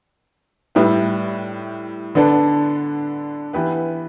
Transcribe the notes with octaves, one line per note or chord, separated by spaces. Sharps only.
A2 G3 E4 B4
D3 B3 D4 A4
E3 B3 G4 B4